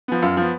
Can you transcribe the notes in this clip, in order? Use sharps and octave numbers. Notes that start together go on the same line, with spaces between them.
F3 B3
F#2 F4
F3 B3